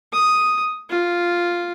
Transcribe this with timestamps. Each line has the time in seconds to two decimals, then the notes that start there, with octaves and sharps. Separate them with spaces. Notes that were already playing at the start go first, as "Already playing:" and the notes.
0.13 D#6
0.90 F4